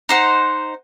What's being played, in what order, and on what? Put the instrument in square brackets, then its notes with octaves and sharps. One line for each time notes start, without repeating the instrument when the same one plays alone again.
[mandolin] D#4 C5 F#5